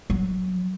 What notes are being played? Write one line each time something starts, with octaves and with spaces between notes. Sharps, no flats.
F#3